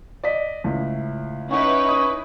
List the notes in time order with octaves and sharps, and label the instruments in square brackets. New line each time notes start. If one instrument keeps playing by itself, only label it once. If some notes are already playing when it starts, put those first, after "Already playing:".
[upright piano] D5 D#5 B6
C#2 A2
[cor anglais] C#4 [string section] D#4 E4 B4 [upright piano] F#5
[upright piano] D#6